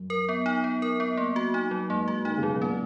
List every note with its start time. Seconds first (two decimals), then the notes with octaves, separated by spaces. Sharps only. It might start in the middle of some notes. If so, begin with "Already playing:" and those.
Already playing: F#2
0.10 A#4
0.29 B3
0.46 D#4
0.64 B3
0.82 A#4
1.00 B3
1.17 A#3
1.36 F#4
1.54 D#4
1.71 F#3
1.89 G#2 A#3
2.08 F#4
2.25 D#3 D#4
2.37 C#3
2.43 F#3
2.50 B2
2.62 A#2 C#4